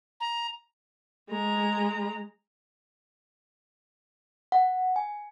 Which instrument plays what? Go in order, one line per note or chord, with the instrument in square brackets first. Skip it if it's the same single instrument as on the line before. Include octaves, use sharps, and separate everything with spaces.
[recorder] A#5
[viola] G#3 A#5
[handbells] F#5
G#5